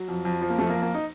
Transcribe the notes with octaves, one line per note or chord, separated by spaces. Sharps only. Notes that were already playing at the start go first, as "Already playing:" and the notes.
Already playing: F#3
F2
F2
F3
A#3
F2 A3
A#3
F2
A#3
D#4